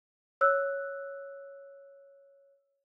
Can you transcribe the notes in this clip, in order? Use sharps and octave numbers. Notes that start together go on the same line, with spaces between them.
C#5 E6 F#6